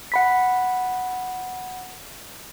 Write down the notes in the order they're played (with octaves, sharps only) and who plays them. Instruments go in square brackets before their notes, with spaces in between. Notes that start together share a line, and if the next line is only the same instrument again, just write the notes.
[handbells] F#5 B5 B6